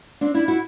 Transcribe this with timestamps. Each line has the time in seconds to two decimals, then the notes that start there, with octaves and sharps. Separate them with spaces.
0.21 C4 D4
0.34 D4 E4
0.48 E4 F#4